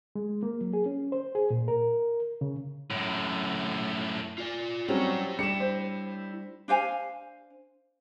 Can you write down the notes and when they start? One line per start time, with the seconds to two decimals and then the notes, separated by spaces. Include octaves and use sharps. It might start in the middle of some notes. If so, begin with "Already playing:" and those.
0.15 G#3
0.43 A#3
0.61 F#3
0.73 G#4
0.86 C#4
1.12 C5
1.35 G#4
1.50 A#2
1.68 A#4
2.41 C#3
2.90 F#2 A2
4.38 F4 D5
4.88 F#3 G3 C4 C#4 E4 C#5
5.39 G3 D4 C#7 E7
5.60 C5
6.68 D4 C5 F5 G#5